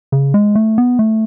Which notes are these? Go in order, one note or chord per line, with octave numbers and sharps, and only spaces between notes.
C#3
G#3
A3
B3
A3